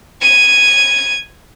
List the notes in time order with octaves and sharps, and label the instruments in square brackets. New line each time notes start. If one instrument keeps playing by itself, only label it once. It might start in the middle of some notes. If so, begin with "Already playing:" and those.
[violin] G#6 D#7